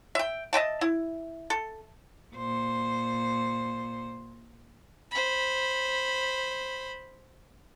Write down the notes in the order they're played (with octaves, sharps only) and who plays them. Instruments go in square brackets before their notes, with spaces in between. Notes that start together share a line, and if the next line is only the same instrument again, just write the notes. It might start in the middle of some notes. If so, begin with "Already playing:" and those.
[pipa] E5 G5
D#5 E5 G5 A5
E4
A4
[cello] A#2 C5
[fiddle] C5 B5